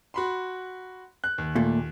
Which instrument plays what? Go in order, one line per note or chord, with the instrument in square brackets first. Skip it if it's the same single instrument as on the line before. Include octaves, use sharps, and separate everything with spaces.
[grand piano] F#4 B5 C6
F#6
D#2
[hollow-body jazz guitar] A#2 A3